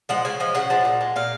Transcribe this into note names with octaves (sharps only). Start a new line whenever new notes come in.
F3 G#3 F#5
C#3 G#5
F3 G#3
C#3 F#5
F3 G#3
A#2
G#3
A#2 F5